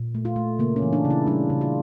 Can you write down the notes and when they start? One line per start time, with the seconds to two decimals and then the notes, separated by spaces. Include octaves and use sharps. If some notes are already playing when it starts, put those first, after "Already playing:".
Already playing: A#2
0.15 A3
0.25 F4
0.36 A3
0.59 C#3 A#3
0.76 C#4
0.82 E3
0.93 D4
1.05 C#3
1.10 E4
1.26 G3 D4
1.50 C#3
1.61 F4